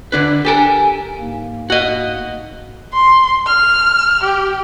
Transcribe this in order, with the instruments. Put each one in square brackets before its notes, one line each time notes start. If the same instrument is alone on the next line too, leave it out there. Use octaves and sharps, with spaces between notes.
[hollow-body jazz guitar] D3 D4 B4
[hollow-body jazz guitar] G4 A4 A#4 [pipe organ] G#5
[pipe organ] G#2 A#3
[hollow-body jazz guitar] F#4 D#5
[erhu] C6
F6
G4